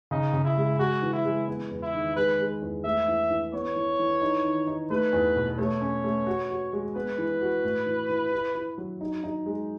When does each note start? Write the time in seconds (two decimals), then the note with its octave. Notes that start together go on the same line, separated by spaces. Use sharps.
0.11 C#3 D#4
0.33 C#3
0.45 E4
0.57 G#3
0.79 G#3 F#4
1.02 E3
1.13 E4
1.25 G#3
1.48 B3
1.71 E2
1.83 E4
1.94 D#3
2.16 G#3 B4
2.39 G#3
2.62 E2
2.84 A3 E5
3.08 E3
3.30 E3
3.53 B3 C#5
3.76 E3
3.99 E3
4.22 D#4
4.45 D#3
4.67 D#4
4.90 A3 B4
5.13 E2
5.36 B2
5.58 A3 C#5
5.81 C#4
6.04 A3
6.27 F#4
6.50 F#4
6.73 G#3
6.95 B3 B4
7.18 E3
7.41 F#4
7.64 A2
7.86 E3
8.09 E3
8.32 E4
8.55 E4
8.78 F#3
9.01 D#4
9.24 D#4
9.46 G#3